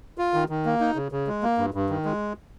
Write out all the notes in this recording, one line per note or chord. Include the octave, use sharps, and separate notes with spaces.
F4
D#3
D#3
A#3
D#4
C#3
C#3
G#3
A#3
G2
G2
D#3
G#3